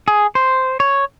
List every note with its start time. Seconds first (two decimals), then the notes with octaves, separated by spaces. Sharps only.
0.08 G#4
0.35 C5
0.80 C#5